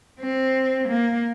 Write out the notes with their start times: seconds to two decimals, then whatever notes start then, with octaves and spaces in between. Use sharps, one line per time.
0.20 C4
0.88 A#3